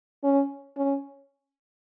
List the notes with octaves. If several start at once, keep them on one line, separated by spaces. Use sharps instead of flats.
C#4
C#4